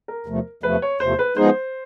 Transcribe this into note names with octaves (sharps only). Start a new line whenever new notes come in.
A#4
E2 C3 F3 A3
E2 C3 F3 A3 B4
C#5
E2 C3 F3 A3 C5
B4
F3 G#3 B3 D#4 G#4 C5